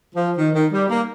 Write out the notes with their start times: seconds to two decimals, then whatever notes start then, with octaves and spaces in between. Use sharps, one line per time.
0.15 F3
0.38 D#3
0.54 D#3
0.72 G3
0.89 A#3